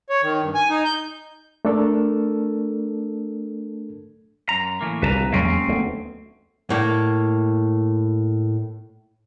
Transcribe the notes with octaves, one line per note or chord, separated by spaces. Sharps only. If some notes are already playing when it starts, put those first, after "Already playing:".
C#5
D#3
G2
G#5
D#4
G6
A3 D4 A4 A#4
F#2 A#5
A2 E3 A#3
C2 A#2 B4 A5 A#5
E2 F#3 G#3 A#3 C4 C#4
D2 A3 B3
A2 A#3